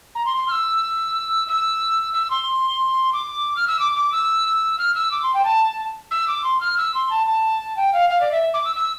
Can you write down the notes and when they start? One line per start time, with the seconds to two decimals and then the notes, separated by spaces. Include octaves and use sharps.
0.15 A#5
0.25 C6
0.37 C6
0.48 F6
0.51 E6
1.47 E6
2.13 E6
2.30 C6
3.13 D6
3.56 F6
3.67 E6
3.79 D6
3.95 D6
4.12 E6
4.78 F6
4.94 E6
5.11 D6
5.22 C6
5.34 G5
5.44 A5
6.11 E6
6.27 D6
6.44 C6
6.60 F6
6.77 E6
6.94 C6
7.10 A5
7.26 A5
7.76 G5
7.93 F5
8.09 F5
8.20 D5
8.31 E5
8.53 D6
8.65 E6
8.75 E6